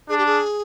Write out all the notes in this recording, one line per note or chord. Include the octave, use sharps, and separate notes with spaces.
D4 G#4
G4
G#4